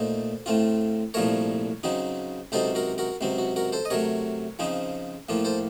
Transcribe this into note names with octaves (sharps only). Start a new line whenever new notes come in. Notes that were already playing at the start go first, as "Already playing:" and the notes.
Already playing: A#2 A3 D#4 A4 C5
A2 A3 C4 F4
C2 A#2 F3 A3 A#4 C#5
C#3 F#3 C4 D#4
C#2 C3 F#3 C4 D#4 A4 C5
F#4 A#4
F#4 A#4
C#2 C3 F#3 C4
F#4
F#4 A#4
A4 C5
D#5
C3 F#3 A3 A#4 C#5
C#3 F3 C4 D#4
A2 F3 A#3 F4
A4 C5